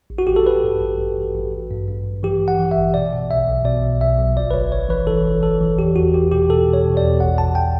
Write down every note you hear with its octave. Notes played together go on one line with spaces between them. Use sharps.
A1
F#4
A1 G4
A4
A1 B4
G2
A1
A1
A1
A1
A1
G2
G2
A1
E3 G4
G2
F#5
E3
A1 E5
B2 D5
B2
B1 E5
B1
B2 D5
B1
B1 E5
B1
G1 D5
B4
G1 C#5
G1 C#5
E3 B4
E3 A4
G1
E3 A4
E3
E2 G4
E2 F#4
E2 G4
B2 G4
B2 A4
B2
C#5
B2
D5
E2
A1 F#5
A1 A5
G5